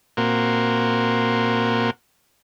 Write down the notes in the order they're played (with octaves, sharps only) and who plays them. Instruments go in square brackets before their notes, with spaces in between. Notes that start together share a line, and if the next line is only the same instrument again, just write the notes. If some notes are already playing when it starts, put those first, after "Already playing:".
[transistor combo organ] A#2 A#3 C4 F#4